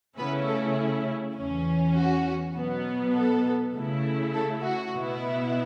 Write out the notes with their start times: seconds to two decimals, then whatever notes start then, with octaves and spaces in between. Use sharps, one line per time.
0.18 C#3 A3 B3 C#4 E4 B4
0.47 A4
1.37 E2 E3 C#4
1.96 F#4
2.55 B2 F#3 B3
3.15 A4
3.74 C#3 A3 E4
4.34 A4
4.63 F#4
4.93 B2 B3 E4